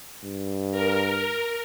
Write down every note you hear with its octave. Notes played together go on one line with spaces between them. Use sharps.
G2
A#4